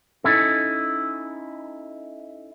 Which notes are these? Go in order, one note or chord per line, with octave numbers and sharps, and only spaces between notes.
C#4 D#4 E4 A4